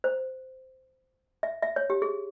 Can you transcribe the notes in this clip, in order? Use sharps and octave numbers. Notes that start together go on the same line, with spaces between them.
C5
E5
E5
C#5
G4
G#4